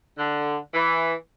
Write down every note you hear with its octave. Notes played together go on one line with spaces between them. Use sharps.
D3
E3